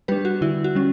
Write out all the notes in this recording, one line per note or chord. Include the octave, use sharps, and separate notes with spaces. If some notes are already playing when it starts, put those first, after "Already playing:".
G3 D4 G4 B4
F#4
D3 E4
F#4
G3 C#4